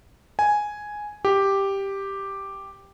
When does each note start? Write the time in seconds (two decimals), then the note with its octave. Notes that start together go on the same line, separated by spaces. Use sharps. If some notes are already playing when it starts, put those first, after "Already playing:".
0.39 G#5
1.25 G4